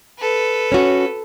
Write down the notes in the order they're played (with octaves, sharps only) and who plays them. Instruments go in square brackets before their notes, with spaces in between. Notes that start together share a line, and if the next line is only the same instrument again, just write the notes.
[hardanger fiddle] A4 B4
[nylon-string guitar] C#4 F#4